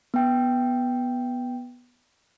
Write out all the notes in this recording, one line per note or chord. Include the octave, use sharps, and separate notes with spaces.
B3 G5